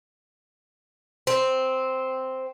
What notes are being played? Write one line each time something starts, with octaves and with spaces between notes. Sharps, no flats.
C4